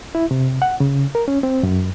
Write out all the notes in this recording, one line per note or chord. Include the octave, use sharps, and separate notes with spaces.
E4
C3
F#5
C#3
A#4
C#4
C4
F#2